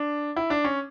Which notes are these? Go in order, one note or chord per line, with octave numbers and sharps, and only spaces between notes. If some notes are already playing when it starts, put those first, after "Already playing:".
Already playing: D4
E4
D4
C#4